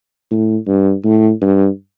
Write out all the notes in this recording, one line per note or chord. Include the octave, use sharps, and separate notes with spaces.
A2
G2
A2
G2